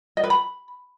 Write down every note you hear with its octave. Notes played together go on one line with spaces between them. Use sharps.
D#5
B4
B5